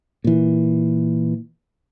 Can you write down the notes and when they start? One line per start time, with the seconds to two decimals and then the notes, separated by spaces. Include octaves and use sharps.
0.24 A#2 E3